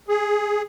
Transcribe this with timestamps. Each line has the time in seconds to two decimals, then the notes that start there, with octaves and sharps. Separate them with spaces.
0.08 G#4